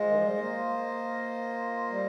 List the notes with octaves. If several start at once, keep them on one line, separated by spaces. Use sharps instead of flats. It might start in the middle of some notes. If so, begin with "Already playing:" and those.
Already playing: G#3 F4 C5 D#5
D#3
F3
G3
G#3
A#3
G3